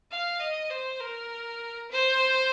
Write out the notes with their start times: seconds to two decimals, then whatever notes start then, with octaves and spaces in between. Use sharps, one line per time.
0.11 F5
0.40 D#5
0.70 C5
1.00 A#4
1.91 C5